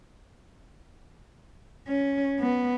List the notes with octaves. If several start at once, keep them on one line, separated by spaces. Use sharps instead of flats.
C#4
B3